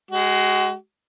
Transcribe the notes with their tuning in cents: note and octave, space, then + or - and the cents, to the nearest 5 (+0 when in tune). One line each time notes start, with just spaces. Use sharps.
G#3 +0 F#4 +35